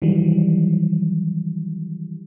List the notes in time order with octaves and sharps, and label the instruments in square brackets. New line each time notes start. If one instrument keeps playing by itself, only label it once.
[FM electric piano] D#3 E3 F#3 G3